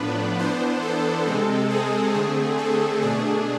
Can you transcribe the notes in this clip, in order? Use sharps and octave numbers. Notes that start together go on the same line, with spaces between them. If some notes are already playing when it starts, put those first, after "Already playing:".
Already playing: A2 F3 B3 D4 B4
E3 B3 D4 C5
A4
C3 G#3 C4
G#4
D3 A3 C4
A4
B2 A3 D4 G#4